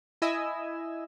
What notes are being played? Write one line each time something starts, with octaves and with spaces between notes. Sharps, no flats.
E4 D#5 G#5 E6